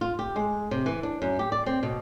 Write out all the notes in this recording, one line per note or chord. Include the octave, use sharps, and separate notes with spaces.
F4
G4
G#3
C3
E3
D4
F#2
G4
D5
C4
B2